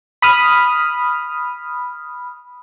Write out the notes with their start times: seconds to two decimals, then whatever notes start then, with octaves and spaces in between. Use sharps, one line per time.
0.22 B5 D#6 F6